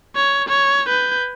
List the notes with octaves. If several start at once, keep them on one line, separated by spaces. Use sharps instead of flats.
C#5
C#5
B4 G6